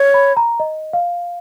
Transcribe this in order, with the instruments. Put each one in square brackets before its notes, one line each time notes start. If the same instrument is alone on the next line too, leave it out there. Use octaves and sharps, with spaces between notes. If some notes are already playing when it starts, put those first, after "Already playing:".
Already playing: [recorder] C#5
[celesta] B5
A#5
D#5
F5